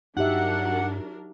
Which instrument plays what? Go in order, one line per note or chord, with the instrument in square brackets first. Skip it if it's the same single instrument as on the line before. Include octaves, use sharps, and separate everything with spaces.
[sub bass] G2 [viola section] F#3 D4 A#4 [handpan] D#4 G4 E5 [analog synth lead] F#5